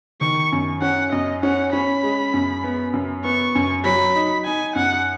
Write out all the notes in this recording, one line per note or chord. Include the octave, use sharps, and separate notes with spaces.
D#3 C#6
F#2
C#4 F#5
F#2 D#5
C#4 F#5
C#4 B5
G#3
F#2
B3
F#2
B3 C#6
F#2
F#3 B5
D#4
D#4 G#5
F#2 F#5